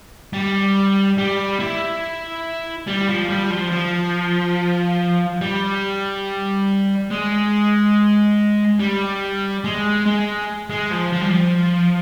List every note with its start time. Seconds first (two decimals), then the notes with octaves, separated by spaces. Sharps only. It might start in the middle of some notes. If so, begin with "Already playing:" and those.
0.33 G3
1.18 G3
1.60 E4
2.87 G3
3.08 F3
3.29 G3
3.50 F3
3.72 F3
5.41 G3
7.10 G#3
8.79 G3
9.64 G#3
10.06 G#3
10.70 G#3
10.91 F3
11.13 F3
11.22 G3
11.31 F3